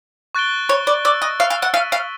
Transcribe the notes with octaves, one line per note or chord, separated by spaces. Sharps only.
C#6 F#6 A6 D7 G7
C#5
D5
D5 E6 A6 D7
D#5
F5
F5
F#5
F5 F#6 B6 D#7 F#7
F5